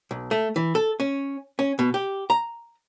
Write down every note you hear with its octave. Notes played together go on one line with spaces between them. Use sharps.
B1
A3
E3
A4
C#4
C#4
B2
G4
A#5